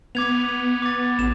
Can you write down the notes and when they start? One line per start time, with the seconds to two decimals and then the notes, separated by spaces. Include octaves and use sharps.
0.15 B3 D6 G#6 F7
0.82 D6 A6
1.19 A1 E7